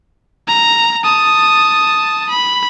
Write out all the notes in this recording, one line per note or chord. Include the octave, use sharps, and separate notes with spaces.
A#5
A5 D#6
B5